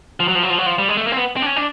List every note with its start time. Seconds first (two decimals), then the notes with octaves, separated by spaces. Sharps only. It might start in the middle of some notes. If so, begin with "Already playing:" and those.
0.20 F3
0.28 F#3
0.35 F3
0.43 F#3
0.50 F3
0.58 F#3
0.66 F3
0.78 G3
0.88 G#3
0.97 A3
1.07 A#3
1.12 C4
1.17 B3
1.37 C4
1.42 D4
1.46 C#4
1.56 D4